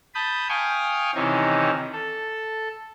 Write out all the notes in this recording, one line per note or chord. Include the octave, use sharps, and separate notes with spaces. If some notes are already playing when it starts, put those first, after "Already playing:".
A5 B5 D#6 G6
F5 G5 G#5 C#6 D#6
C3 D#3 E3 C#4 D#4
A4